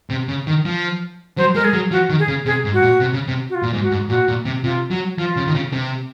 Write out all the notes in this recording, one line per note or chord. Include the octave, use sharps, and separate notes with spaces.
C3
C#3
D#3
F3
F#3 C5
G#3 A#4
G#4
F#3
F3 F#4
D#3
G#4
C#3
C3 G#4
G#2
F#4
A#2
C3
C#3
C3
F#4
F4
A#2
G#2
F#4
G#2
A#2 F#4
A#2
C3
C3 F4
F#3
F3 F4
C#3
D#3
C#3
C3